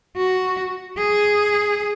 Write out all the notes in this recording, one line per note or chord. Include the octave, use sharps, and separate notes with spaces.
F#4
G#4